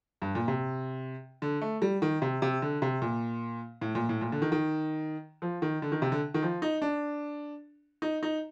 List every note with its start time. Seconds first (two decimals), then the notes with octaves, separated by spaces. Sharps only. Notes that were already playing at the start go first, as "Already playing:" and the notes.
0.22 G2
0.35 A#2
0.48 C3
1.42 D3
1.62 A3
1.82 G3
2.02 D#3
2.22 C3
2.42 C3
2.62 D3
2.82 C3
3.02 A#2
3.81 A2
3.95 A#2
4.09 A2
4.21 A#2
4.32 D3
4.42 D#3
4.52 D#3
5.42 F3
5.62 D#3
5.82 D3
5.92 D#3
6.02 C3
6.12 D3
6.34 D#3
6.42 F3
6.62 D#4
6.82 D4
8.02 D#4
8.23 D#4